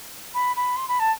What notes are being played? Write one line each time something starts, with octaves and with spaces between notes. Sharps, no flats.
B5
B5
C6
B5
A5